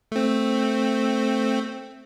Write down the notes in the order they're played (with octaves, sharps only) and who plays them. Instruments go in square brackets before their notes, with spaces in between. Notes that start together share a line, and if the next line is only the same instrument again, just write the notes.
[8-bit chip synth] A3 C4